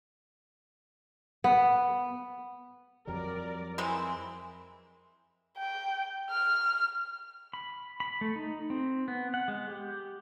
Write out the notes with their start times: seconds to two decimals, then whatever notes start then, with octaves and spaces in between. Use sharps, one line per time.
1.44 B3
3.07 F2 F#3 G3 A#4 D5
3.78 E3 G#3 C4 E4 A#4
5.58 G5
6.30 F6
7.54 B5
8.00 B5
8.21 A3
8.36 D#4
8.70 C4
9.08 B3
9.34 F#5
9.48 G#3
9.70 G4